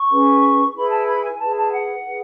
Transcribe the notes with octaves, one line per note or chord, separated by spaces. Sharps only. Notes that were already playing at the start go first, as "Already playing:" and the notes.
Already playing: C#6
C#4 G#4 B4
E4 G#4 B4 B5
A5
B5
G#5
E4 G#4 B4 A5
A5
F#5
E4 G#4 B4